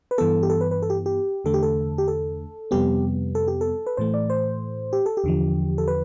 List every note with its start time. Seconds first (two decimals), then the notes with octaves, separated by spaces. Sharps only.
0.11 B4
0.18 G2 E3 B3 A4
0.43 G4
0.50 A4
0.61 B4
0.71 B4
0.82 A4
0.90 G4
1.06 G4
1.44 E2 D3 A3 A4
1.54 G4
1.63 A4
1.98 G4
2.08 A4
2.71 F2 C3 G3 B3 G4
3.35 A4
3.48 G4
3.61 A4
3.87 B4
3.97 A2 E3 A3 C5
4.14 D5
4.30 C5
4.93 G4
5.06 A4
5.17 G4
5.24 E2 D3 F3
5.78 A4
5.88 B4